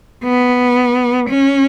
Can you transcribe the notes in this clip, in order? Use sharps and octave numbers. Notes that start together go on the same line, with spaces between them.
B3
C#4